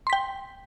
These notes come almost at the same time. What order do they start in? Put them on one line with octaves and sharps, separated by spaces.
C6 B6 G5